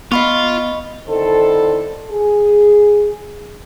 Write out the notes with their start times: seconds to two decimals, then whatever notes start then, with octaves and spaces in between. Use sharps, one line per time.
0.12 B3 F4 D#5 B5 C#6
1.08 D3 D#3 C4 E4 A4
2.10 G#4